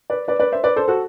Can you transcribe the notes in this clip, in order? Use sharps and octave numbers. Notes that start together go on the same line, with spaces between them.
B4 D5
B4 D5
B4 D5
C5 E5
B4 D5
A4 C5
F#4 A4